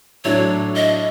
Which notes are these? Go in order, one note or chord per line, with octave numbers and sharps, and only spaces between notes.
A2 F#3 A3 D4 C#5
D#5